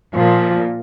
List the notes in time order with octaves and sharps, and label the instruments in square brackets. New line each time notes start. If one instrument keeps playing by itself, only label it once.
[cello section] A#2 [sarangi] F3